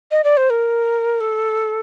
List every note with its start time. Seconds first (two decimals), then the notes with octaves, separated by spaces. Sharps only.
0.11 D#5
0.24 D5
0.37 C5
0.50 A#4
1.21 A4